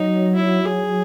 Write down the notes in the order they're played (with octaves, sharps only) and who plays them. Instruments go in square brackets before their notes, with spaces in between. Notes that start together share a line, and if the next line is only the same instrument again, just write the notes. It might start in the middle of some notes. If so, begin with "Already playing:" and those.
Already playing: [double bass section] F#3 [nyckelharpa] D#4
[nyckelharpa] E4
G#4